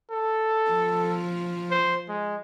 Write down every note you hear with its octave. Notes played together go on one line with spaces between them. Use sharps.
A4
F3
C5
G#3